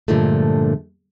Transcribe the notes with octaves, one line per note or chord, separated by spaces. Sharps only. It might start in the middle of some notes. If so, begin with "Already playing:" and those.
G2 A#2 D3 F3 G#3 A3